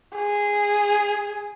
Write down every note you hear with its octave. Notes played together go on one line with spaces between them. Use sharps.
G#4